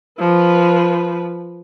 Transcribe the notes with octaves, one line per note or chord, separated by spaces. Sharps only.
F3 B4